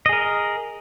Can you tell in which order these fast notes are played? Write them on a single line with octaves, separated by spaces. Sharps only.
D#5 G#4 A#4